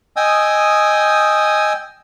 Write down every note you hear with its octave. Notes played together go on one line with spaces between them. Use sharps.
D#5 G5 G#5 D#6 E6